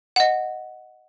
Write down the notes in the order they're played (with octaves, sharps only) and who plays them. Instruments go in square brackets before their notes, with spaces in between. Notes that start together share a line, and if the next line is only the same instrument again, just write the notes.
[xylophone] D#5 F#5